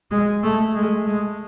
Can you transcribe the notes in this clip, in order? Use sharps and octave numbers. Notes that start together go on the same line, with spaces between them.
G#3
A3
G#3
G#3